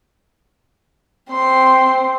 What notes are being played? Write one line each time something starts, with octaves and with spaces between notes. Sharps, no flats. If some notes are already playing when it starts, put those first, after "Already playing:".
C4 C6